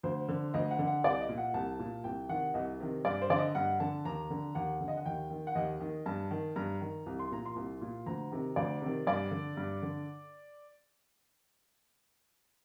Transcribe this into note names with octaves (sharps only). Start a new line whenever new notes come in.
D2 C5
D3
D2 D#5
F#5
D3
F#5
C2 D5
D#5
A#2
F#5
C2 A5
A#2
C2 G5
C3 D#3 F#5
C2 D#5
C3 D#3
G2 D5
C5
D3 D5
D#5
G2 F#5
D3 A5
D#2 A#5
D3
D#2 F#5
D3
D#5
F#5
D#2 G5
D#3
F#5
D#2 D#5
D#3
G2 A5
D#3
G2 A#5
D#3
C2
C6
A#2 A#5
C6
C2
A#2
D2 A#5
C3 D#3
D2 D5
C3 D#3
G2 D5
D3
G2
D3